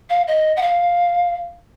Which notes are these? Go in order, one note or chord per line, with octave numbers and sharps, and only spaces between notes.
F5
D#5
F#5
F5